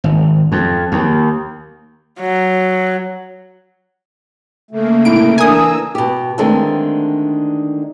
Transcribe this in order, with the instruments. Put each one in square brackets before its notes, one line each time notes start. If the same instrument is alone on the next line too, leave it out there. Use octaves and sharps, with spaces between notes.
[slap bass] G#1
F2
D#2
[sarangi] F#3
[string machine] C#3 A#3 [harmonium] A3
[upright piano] C2 A2 [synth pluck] D7
[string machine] E3 A#5 E6 [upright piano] D4 A#4 [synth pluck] G#5 D#6
[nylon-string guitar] B2 G4
D3 D#3 G#3 A3 C4 D4